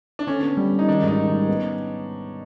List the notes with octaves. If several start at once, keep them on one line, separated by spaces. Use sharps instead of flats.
D4
D3 C#4
B3
G3
G3
D#4
D#3 D4
G#2
D#4
D#3
D#4
G3
B3